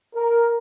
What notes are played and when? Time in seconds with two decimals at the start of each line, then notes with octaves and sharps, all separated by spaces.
0.16 A#4